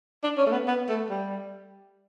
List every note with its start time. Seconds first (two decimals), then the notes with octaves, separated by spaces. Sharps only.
0.23 D4
0.37 C#4
0.46 A3
0.52 B3
0.67 B3
0.89 A3
1.10 G3